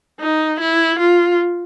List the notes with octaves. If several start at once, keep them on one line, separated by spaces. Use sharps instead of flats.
D#4
E4
F4